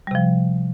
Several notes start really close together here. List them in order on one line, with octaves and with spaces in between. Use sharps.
G3 C3 F3